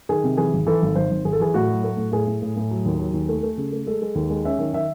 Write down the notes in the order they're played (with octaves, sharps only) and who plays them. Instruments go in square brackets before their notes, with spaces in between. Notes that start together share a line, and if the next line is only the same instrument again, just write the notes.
[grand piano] D#3 G#4
C3
E3 G#4
G#1
E3 A4
G#1
G#1 C5
G#1
G#1 G#4
A4
E3 G#4
A2 F#4
F#3
A3
A2
A2 G#4
A2
A2
A2
F#3
D#2
F#3
D#2
A3
A3
C#3
A3
G#3 A4
G#3
D#2
G#3
C#4 E5
D#3
D#3 E5